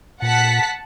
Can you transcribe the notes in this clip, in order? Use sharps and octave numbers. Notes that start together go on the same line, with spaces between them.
A#2 F#5 A5 B6